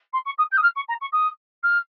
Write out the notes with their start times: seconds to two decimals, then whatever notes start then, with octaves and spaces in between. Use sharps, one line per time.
0.13 C6
0.25 C#6
0.38 D#6
0.51 G6
0.57 D#6
0.63 F6
0.76 C#6
0.88 A#5
1.01 C#6
1.12 D#6
1.63 F6